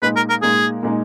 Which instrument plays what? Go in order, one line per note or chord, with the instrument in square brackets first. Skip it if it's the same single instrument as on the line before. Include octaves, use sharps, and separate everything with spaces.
[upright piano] A#2 G#3 D#4 [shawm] B4
[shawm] A#4
A#4
[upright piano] A#2 G#3 D#4 [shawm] G#4
[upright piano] A#2 G#3 D#4